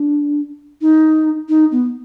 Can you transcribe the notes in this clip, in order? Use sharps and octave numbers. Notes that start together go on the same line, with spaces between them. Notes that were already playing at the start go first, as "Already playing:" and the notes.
Already playing: D4
D#4
D#4
B3